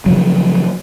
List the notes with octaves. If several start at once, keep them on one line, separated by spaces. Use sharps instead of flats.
C#3 F3 F#3